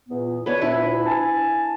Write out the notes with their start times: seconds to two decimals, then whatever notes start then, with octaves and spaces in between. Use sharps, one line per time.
0.09 E2 A#2 B3
0.46 B3 D4 F#4 B4 C#5
0.61 D2 A#2 D4 E4
1.06 G#5 A5